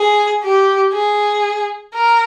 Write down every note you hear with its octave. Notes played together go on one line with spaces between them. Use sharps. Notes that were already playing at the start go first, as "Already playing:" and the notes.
Already playing: G#4
G4
G#4
A#4